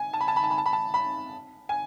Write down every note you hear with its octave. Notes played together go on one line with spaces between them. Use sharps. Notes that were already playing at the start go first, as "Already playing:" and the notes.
Already playing: G#5
A5
B5
A5
B5
A5
B5
A5
B5
A5
B5
G#5